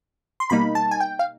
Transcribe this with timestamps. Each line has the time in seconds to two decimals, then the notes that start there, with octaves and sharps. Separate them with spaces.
0.40 C6
0.50 B2 G3 A#3 D#4 B5
0.75 A5
0.91 G#5
1.01 G5
1.19 F5